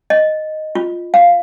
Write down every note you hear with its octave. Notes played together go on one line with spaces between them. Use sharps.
D#5
F4
F5